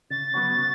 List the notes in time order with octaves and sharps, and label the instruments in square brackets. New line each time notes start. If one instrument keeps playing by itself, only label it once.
[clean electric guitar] C#3 [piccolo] A6
[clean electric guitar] F#3 B3 F#4 C#5
C#3